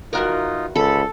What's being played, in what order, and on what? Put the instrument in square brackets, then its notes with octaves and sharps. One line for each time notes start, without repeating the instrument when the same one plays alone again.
[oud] E2 F#4 A#4 [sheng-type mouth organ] D#4 F4
[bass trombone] C#2 [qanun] A4 [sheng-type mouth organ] B5